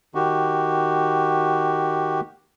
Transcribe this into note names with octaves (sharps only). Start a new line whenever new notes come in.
D#3 F#4 G4